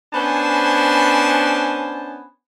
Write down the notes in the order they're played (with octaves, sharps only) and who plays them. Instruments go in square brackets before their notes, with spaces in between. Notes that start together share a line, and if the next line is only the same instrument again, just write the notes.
[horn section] B3 C#4 D4 C5 G#5 A5